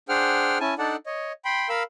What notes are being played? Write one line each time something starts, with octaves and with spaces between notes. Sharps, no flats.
D4 G#4 C5 F#5 G5 F6
C#4 E4 G#5 A5
D4 D#4 A4 D5 F#5 A5
C#5 D#5
G5 B5 C6
A#4 F5 B5 E6